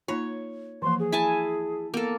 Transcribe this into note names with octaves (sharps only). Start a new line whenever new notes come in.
A#3 D#4 F4 C#5
E3 F3 A#3 C6
G#4
E4 G#5 A5
A#3 B3 A4